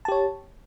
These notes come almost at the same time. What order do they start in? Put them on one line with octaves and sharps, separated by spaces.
A5 G4 C#5